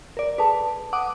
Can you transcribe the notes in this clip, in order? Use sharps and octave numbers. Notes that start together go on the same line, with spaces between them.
A#4 D5
G#4 A4 B4 A5
F#5 D6 D#6